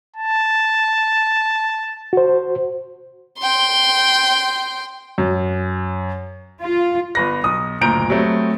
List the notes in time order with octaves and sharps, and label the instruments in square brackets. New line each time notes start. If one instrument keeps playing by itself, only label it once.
[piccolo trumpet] A5
[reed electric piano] F#4 C5
[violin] G5 C6
[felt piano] F#2
[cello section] F4
[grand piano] G1 B4 A#6
B1 D#6
F#1 D2 A#2 A#5 G6 D7
F#3 G3 A3 C4